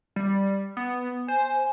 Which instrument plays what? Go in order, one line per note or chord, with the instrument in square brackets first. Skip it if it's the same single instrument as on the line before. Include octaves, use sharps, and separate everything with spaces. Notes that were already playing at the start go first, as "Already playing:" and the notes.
[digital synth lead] G3
B3
[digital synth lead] C5 [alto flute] G#5